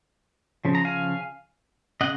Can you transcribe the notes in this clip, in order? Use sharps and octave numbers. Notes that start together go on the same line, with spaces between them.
C#3 F3
A#5
F5 G#5
C#3 D#5 F#5